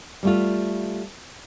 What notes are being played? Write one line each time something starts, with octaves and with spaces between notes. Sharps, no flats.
G3 A3 F4